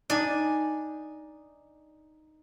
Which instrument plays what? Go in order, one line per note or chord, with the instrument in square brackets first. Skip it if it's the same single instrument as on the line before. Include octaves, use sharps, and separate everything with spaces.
[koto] D4 G#5 [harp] D#4 D5